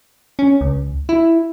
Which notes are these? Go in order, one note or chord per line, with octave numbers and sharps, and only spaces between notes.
C#4
C#2
E4